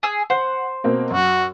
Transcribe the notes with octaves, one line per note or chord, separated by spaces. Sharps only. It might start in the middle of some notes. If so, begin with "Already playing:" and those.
G#4 G#5 E6
C5 F#5
B2 A#3 C4
F#2 F#4